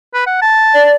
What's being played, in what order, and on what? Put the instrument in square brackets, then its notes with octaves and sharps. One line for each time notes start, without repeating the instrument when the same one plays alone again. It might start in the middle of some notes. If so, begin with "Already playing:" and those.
[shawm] B4
F#5
A5
[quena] D5